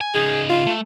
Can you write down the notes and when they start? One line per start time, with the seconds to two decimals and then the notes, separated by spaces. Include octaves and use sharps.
0.01 G#5
0.14 C#3 D#4 G#4
0.49 F4
0.66 A3